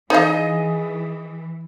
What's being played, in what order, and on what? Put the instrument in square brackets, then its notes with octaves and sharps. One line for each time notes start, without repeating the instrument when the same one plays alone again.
[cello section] E3 [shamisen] D#4 F5 [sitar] G#4 C5 D#5